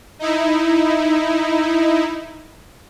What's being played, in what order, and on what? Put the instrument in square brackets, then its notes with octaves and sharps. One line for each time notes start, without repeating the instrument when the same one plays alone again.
[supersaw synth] D#4 E4